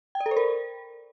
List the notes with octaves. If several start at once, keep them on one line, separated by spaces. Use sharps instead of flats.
G5
D5
A4
C5
A#4